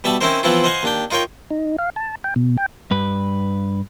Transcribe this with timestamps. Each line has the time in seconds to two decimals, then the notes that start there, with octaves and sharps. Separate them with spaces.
0.04 B2 G3 E5 A5 B5
0.21 C4 C#4 D#4 E4 A#4 C5
0.43 E3 F3 B3 C4 E4 F4
0.64 C5 D#5 F5 F#5 G#5
0.83 D#2 D4 G5
1.11 D#4 F4 A#4 C#5 G5
1.51 D#4
1.79 F5
1.96 A5
2.24 G5
2.36 B2
2.57 G5
2.91 G2 B4